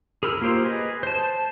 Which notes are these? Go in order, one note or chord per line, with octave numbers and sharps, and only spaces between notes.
G#4 A#4 B5 E6 F6
A#3 F4 G4 C5
G#4 B4 D#5
C5 A5